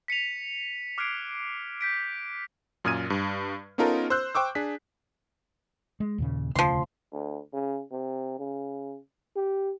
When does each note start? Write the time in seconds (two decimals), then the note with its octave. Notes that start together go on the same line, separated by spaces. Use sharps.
0.08 B6 C#7 D#7 F7
0.98 D6 F6 F#6 G#6 C7 D7
1.81 G6 B6 D7
2.84 F#2 A#2 D#6 F6 G#6 D#7
3.10 G2
3.78 B3 C#4 D#4 F4 A4 A#4
4.10 C5 E6 F#6 G6
4.35 C5 G5 C#6 D6 E6
4.55 D4 G#4 B6
6.00 G#3
6.18 D#2 A#2 C#3
6.56 E1 D2 C#3 F3 C6
7.13 D2
7.53 C#3
7.92 C3
8.39 C#3
9.36 G4